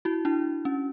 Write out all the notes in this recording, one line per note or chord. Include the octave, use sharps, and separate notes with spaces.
E4 F#4
D4 E4
C#4